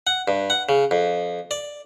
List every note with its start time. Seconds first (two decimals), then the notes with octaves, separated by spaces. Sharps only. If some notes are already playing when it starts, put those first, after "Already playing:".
0.07 F#5
0.28 G2
0.50 F#5
0.69 C#3
0.91 F2
1.51 D5